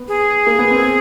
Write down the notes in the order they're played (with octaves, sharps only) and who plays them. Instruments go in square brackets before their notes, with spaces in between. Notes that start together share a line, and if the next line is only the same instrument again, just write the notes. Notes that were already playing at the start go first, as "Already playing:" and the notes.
Already playing: [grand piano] B3
[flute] G#4
[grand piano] A#3
B3
C4